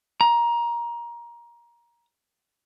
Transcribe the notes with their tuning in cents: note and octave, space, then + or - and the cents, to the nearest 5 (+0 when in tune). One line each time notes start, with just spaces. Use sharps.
A#5 +20